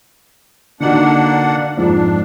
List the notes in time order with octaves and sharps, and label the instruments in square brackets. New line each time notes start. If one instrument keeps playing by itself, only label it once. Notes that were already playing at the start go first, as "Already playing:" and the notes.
[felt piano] D3 D#4 F#4 [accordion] A#3 D4 F#5
[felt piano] F2 G#2 [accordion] D4